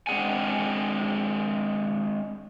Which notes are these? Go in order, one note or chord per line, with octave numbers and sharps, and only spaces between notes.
G#3 C4 D4 G#4 F#5 G#5